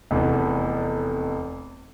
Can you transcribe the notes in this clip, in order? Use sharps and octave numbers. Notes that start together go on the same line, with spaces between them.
F1 E2